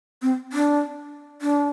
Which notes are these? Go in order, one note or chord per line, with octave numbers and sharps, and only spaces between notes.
C4
D4
D4